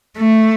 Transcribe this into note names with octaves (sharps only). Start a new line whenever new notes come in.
A3